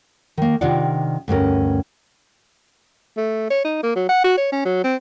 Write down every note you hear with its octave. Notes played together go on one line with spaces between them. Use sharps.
D#3 A#3
C3 D#3 D4 F4 D5 F#5
D2 G2 C#4 A#4
A3
C#5
D#4
A#3
F#3
F#5
F#4
C#5
C#4
F#3
C4